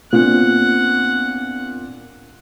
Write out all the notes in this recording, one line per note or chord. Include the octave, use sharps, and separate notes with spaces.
A#2 B3 C4 D4 F#5